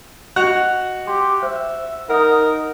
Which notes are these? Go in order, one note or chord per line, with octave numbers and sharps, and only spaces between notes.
F#4 D#5 F7
G4 C6
C5 E5
D#4 A#4 F#5 D#6